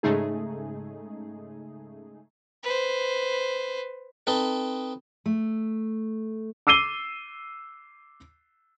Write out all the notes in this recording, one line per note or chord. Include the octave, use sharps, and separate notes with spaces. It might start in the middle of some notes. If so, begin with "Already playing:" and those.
G#2 C#3 G#3 A3 D#4 G#4
B4 C5
C4 D#4 A4 B4
A3
D6 E6 C7 D#7 G7